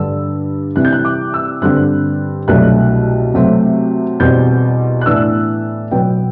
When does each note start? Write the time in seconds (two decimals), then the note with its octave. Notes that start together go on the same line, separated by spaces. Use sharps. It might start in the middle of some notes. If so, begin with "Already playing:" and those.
Already playing: G2 D3 G3 D4 E6
0.76 C3 E3 G3 C4 F#6
0.85 G6
0.93 F#6
1.05 D6
1.34 E6
1.62 G2 D3 G3 C4 F#6
2.48 C2 B2 F#3 A3 D4 F#6
3.34 C3 F#3 A3 C4
4.20 E2 B2 G3 C4 G6
5.01 F#6
5.06 A2 E3 B3 D4 E6
5.91 B2 F#3 B3 G5